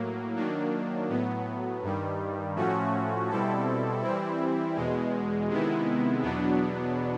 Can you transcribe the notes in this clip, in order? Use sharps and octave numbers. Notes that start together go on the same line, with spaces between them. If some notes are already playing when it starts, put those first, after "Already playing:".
Already playing: A2 F#3 A#3
D#3 F#3 A#3 D4
A2 F#3 B3
G2 D#3 G3
A2 F3 A3 C#4 F#4
B2 G3 C4 E4 A4
E3 G3 C4 E4
E2 B2 G#3
C3 D#3 G#3 B3 E4
E2 B2 F#3 B3 D4